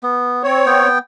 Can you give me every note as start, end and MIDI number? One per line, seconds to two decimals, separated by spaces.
0.03 0.43 59
0.43 0.88 60
0.43 0.88 73
0.66 0.98 59
0.66 0.98 79